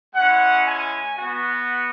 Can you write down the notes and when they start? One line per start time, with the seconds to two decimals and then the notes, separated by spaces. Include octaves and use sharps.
0.14 G#3 C#4 E4 F#5
0.66 G#5
1.18 B3 F#4